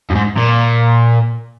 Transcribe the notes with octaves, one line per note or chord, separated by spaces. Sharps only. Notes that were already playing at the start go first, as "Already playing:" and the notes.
F#2
G#2
A#2